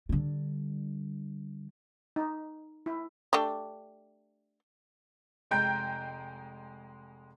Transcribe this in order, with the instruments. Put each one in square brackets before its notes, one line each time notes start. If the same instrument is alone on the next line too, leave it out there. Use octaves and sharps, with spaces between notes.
[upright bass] D3 G3
[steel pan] D#4
E4
[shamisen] A3 D4 G4
[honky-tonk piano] F1 G#3 G5 A#5 G6 D7